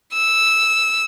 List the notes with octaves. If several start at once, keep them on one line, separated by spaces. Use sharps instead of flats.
E6